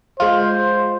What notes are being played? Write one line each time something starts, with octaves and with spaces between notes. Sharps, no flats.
G#3 F4 C5